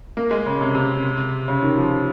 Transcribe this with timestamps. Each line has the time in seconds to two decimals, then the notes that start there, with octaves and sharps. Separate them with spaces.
0.17 A#3
0.31 G#3
0.46 C#3
0.61 C3
0.75 C3
1.48 C#3
1.62 D#3
1.78 F3